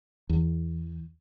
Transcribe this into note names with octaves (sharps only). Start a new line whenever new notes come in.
E2